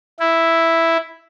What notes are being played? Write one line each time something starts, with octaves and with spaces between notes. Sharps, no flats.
E4